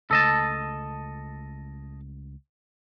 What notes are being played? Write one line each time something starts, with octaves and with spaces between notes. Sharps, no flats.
C#2 A3 A4 D#5 A5